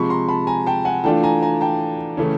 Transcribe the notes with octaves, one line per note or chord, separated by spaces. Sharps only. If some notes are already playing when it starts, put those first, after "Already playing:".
Already playing: C3 F3 G#3 B5 C#6
A#5 C6
A5 B5
G#5 A#5
G5 A5
F#5 G#5
E3 A3 D4 F4 G5 A5
G#5 A#5
G#5 A#5
G5 A5
C#3 E3 A3 C#4